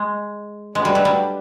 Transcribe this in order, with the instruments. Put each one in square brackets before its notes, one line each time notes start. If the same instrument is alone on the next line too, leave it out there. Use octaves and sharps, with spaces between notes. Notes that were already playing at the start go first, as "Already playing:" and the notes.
Already playing: [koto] G#3
[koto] G#3 [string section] A3 D4 F#4 B4
[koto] G3
F#3
G3